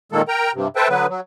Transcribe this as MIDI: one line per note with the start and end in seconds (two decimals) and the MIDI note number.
0.12 0.22 46
0.12 0.22 51
0.12 0.22 56
0.12 0.22 58
0.12 0.22 69
0.28 0.51 70
0.28 0.51 79
0.28 0.51 82
0.55 0.68 43
0.55 0.68 48
0.76 0.88 69
0.76 0.88 71
0.76 0.88 72
0.76 0.88 76
0.76 0.88 79
0.76 0.88 81
0.89 1.06 50
0.89 1.06 54
0.89 1.06 59
0.89 1.06 71
1.09 1.20 54